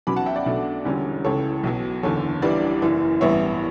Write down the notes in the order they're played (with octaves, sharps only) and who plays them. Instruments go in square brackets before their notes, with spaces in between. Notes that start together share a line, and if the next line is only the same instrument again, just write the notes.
[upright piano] B1 B2 F#3 C#4 B5 D6
F#5 A5
E5 G5
D5 F#5
B1 B2 A3 D4
E1 E2 D3 G3 C#4
C#2 C#3 E3 A4 C#5
B1 B2 F#3
F#1 E2 D3 A4 C#5
G1 G2 E3 G3 D4 B4 D5
F#1 F#2 E3
A1 G2 E3 B3 C#5 E5